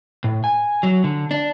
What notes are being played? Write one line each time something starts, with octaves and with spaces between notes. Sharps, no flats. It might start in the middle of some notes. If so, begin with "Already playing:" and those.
A2
G#5
F#3
D3
D4